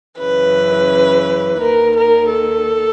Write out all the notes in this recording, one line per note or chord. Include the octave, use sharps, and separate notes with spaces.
F#2 C#3 E3 B4
D#2 D#3 A#4
A#4
A4